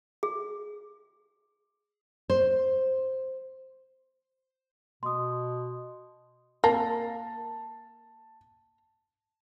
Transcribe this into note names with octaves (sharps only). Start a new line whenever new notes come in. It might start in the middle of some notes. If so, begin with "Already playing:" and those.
G#4
C5
B2 C6 D#6
A#3 A5